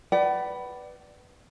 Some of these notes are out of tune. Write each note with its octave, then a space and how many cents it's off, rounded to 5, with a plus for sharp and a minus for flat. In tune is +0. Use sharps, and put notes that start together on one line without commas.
B4 +0 D5 +5 F#5 +40